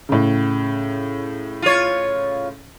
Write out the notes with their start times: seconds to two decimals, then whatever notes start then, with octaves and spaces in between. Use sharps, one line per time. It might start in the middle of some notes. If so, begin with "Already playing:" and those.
0.09 A2 C#3
1.62 F4 C#5